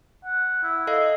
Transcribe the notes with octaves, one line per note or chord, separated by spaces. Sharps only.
F#5
E4
A4 D#5 F5